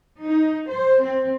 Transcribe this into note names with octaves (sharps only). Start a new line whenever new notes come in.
D#4
C5
C4